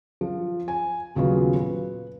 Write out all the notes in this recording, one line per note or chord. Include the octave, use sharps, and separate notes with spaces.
F3
G#5
D#1 C#3 F#3 B3 F4
B4